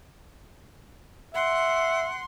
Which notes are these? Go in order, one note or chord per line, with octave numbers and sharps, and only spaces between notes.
E5 F#5 C6